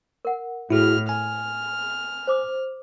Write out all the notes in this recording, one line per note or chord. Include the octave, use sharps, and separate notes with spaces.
A#4 F#5
A2 E4 F#4 G#4 F6
G#5 F6
C5 D6 D#6